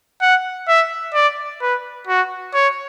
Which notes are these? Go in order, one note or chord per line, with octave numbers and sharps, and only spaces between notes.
F#5
E5
D5
B4
F#4
C#5